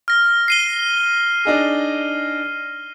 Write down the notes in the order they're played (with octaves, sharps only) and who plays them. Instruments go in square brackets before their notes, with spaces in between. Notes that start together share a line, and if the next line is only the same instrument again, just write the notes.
[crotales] F6 A#6
C7 D#7 G7
[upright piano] D4 D#4 G#4